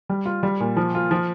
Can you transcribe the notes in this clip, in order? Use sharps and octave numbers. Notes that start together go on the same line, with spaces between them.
G3
F4
G3
A#2
F3
F4
F3